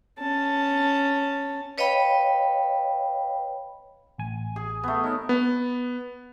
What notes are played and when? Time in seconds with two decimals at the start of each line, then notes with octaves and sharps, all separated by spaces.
0.20 C#4 A5
1.78 B4 C#5 D#5 F5 G5 B5
4.18 A1 G#5
4.56 G#4
4.83 A3 B3
5.04 D#4 A#4 C#5
5.29 B3